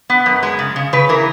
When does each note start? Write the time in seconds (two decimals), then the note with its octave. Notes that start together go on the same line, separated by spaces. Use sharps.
0.10 B3
0.26 F#2
0.43 G#3
0.59 C#3
0.76 C#3
0.93 C#3 B4
1.09 E3 A#4